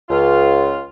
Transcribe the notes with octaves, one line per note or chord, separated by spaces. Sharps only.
C#2 F4